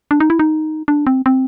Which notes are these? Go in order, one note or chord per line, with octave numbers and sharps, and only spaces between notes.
D4
D#4
E4
D#4
D4
C4
C4